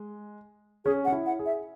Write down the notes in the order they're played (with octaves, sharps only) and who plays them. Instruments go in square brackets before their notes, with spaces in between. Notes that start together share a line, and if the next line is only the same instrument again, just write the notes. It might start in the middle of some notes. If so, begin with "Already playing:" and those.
Already playing: [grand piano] G#3
[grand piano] C#4 [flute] G#4
[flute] F#5
[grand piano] C#4
E4
[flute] F#5
[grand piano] G#4
[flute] E5